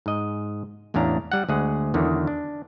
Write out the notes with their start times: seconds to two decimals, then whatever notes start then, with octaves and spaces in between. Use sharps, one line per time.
0.06 G#2 D#5
0.94 A1 E2 C#4 D4 F5 A#5
1.32 G3 F#5
1.49 D2 G#3 G#4 F#5
1.94 E2 D3 D#3 F#3
2.27 D4